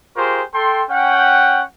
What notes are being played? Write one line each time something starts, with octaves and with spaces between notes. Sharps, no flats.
F4 G4 G#4 A#4 C5 C#6
A4 G5 C6
C#4 F#5 G5